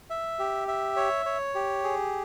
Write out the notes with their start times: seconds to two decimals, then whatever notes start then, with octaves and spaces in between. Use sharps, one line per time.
0.10 E5
0.39 G4
0.68 E5
0.96 C#5
1.26 C#5
1.55 G4
1.84 G#4